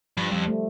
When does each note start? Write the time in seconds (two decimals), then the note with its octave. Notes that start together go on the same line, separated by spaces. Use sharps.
0.17 G2 F3
0.31 F2 G3
0.47 A3